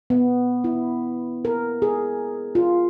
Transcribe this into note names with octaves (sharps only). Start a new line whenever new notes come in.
B3
E4
A#4
G#4
F4